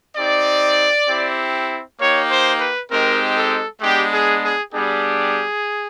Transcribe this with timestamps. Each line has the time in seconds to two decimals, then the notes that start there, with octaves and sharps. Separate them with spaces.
0.16 C4 D#4 G4 D5
1.08 C4 E4 G4
1.98 A#3 D#4 G4 C#5
2.29 C5
2.60 B4
2.90 G#3 C4 D#4 G4 A#4
3.36 A4
3.81 G#3 B3 D4 G4
4.12 G#4
4.41 G#4
4.72 G3 B3 D4 G4 G#4